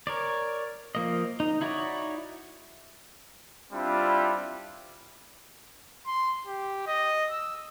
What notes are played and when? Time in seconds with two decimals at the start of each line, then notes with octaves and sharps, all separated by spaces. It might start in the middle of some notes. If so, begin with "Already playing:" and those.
0.07 A#4 C#5 D5
0.95 F3 A#3 D#5
1.40 D#4
1.61 D#4 E4 F#4 C#5 D5
3.73 G3 C4 D4 E4 F4
6.07 C6
6.47 G4
6.87 D#5
7.31 E6